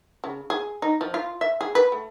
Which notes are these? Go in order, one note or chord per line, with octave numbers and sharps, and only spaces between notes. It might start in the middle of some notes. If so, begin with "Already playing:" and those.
C#3
G#4
D#4
F3
F4
E5
G#4
B4
A3